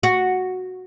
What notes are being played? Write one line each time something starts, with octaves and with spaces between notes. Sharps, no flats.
F#4